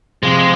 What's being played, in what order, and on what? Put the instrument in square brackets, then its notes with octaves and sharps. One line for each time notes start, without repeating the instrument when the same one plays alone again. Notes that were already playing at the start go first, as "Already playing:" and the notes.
[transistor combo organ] C3 F3 C4 [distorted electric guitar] G#3